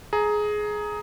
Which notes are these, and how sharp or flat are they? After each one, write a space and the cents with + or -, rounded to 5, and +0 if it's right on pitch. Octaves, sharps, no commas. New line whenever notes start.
G#4 +15 A#5 +0